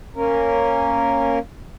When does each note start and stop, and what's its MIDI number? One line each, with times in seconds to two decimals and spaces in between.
0.15 1.39 58
0.15 1.39 61
0.15 1.39 70